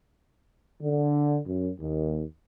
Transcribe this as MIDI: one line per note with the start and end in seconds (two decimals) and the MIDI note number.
0.82 1.38 50
1.47 1.69 42
1.81 2.23 39